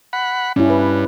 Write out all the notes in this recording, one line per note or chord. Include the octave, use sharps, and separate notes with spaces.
F#5 B5
G2 C#4 E4
B4